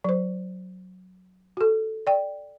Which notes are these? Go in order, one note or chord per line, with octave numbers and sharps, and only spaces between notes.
F#3 C5
F#4 A4
D5 G5